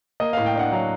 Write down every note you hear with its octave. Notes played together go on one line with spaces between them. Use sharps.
A#3 D#5
F5
A2
G5
D4 F#5
F#3 F5